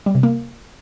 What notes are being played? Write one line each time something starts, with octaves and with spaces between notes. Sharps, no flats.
G3
C3
A#3